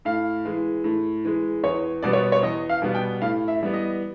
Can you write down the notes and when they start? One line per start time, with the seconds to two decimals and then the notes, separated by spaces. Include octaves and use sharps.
0.05 A2 F5
0.45 E3 G#3
0.84 A2
1.25 E3 G#3
1.63 E2 C#5
2.03 B2 G3 B3 D5
2.13 C#5
2.32 C#5
2.42 E2 D#5
2.69 F5
2.82 B2 G3 B3
2.95 G5
3.21 A2 F5
3.48 E5
3.61 E3 G3 B3
3.74 D#5